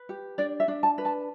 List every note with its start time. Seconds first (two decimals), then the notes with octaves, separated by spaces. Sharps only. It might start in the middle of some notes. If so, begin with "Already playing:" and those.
Already playing: B4
0.09 G4
0.38 D4 D5
0.60 E5
0.68 D4
0.83 A5
0.98 B4
1.05 A5